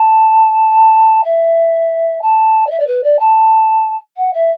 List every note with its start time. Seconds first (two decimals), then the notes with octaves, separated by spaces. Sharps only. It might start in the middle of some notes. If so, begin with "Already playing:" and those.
Already playing: A5
1.24 E5
2.21 A5
2.66 D5
2.70 E5
2.79 D5
2.87 B4
3.03 D5
3.19 A5
4.17 F#5
4.33 E5